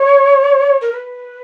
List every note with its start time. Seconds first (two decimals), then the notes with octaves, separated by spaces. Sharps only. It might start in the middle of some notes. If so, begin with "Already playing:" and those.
Already playing: C#5
0.81 A#4
0.92 B4